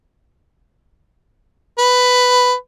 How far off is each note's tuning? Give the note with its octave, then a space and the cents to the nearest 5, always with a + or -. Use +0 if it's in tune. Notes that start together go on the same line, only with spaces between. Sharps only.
B4 +10